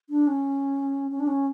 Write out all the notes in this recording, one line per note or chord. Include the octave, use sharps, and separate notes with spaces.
D4
C#4
C#4
D4
C#4